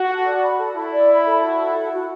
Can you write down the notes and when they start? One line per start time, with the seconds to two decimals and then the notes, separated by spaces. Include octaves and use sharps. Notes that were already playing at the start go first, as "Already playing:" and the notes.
Already playing: F#4
0.09 A4
0.26 D5
0.42 B5
0.58 A4
0.75 E4 A4
0.92 D5
1.09 B5
1.25 A4
1.43 F#4
1.59 A4
1.75 F#5
1.92 F#4